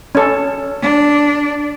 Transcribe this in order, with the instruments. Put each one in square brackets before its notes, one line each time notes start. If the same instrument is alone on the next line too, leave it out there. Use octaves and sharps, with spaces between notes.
[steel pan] C#4 A4
[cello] D4